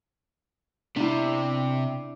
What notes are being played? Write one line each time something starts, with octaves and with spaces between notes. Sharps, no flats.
C3 D4 E4